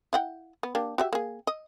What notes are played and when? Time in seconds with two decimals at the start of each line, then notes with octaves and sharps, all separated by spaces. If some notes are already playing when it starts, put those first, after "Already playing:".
0.13 E4 F#5 G5
0.63 B3
0.75 A#3 D4 G4
0.98 F#4 G4 E5
1.13 A#3 G#4
1.47 D#5